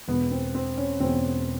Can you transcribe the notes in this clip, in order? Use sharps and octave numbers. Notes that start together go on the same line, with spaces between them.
E1 E2 B2 B3
C4
C4
C#4
E1 E2 B2 C4